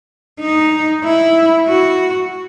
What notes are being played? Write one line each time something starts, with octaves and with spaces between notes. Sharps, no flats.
D#4
E4
F#4